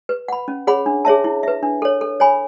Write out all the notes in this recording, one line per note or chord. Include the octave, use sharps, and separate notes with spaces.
B4
F#5 B5
C#4
G#4 C#5 F#5 B5
D4
G#4 C#5 E5 A5
E4
B4 E5
D4
A4 C#5
A4
C#5 G#5 B5